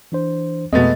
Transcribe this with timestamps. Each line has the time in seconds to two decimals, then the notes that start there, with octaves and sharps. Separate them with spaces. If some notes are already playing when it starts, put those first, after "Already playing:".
0.12 E3 D4 C5
0.73 F2 B2 G#3 A3 B3 D#5 A6